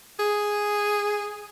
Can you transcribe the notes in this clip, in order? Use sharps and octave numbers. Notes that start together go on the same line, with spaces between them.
G#4